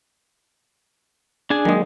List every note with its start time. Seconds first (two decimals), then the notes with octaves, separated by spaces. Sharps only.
1.50 D4 G#4 G#5
1.65 D#3 F#3 G#3 A#3 D#5